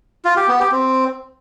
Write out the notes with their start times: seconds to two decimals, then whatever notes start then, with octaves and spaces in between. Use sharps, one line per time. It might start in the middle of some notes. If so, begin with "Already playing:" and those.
0.25 F4
0.36 G4
0.48 B3
0.60 G4
0.72 C4